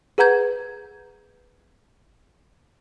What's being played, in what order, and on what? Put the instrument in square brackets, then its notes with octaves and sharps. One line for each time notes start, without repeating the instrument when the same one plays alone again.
[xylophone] G#4 B4 F#5 A#5 G6 G#6